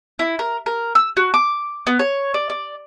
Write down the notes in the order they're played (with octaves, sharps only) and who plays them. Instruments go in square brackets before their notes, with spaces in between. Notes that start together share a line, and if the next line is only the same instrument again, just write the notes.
[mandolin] E4
A#4
A#4
E6
F#4
D6
B3
C#5
D5
D5